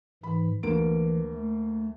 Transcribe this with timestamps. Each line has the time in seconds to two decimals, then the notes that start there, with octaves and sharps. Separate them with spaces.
0.23 G#2 E3 B5
0.63 D2 E3 A#3 D7
1.33 A3